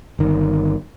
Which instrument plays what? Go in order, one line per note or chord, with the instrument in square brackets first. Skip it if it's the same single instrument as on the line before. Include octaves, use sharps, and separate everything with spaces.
[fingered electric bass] G1 D#3